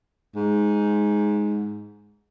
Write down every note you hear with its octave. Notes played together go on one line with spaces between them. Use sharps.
G#2